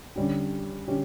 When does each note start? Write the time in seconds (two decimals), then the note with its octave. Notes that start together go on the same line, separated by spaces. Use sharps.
0.16 D3 G3 C#4 G4
0.88 D3 G3 C#4 G4